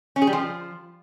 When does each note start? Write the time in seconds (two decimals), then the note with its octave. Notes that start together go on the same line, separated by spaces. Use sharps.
0.16 C#4
0.22 G#4
0.27 G3
0.33 F3